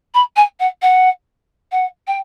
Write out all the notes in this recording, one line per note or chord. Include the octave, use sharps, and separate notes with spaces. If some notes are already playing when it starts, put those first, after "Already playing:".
B5
G#5
F#5
F#5
F#5
G5